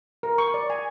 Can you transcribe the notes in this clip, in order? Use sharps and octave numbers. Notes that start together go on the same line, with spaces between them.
A#4
C#6
D5
G#5